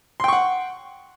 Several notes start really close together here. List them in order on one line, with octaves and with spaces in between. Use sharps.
C6 G5 C#6 F#5